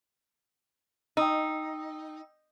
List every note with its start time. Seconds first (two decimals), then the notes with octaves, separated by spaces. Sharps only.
1.17 D#4 G5 D#6 E6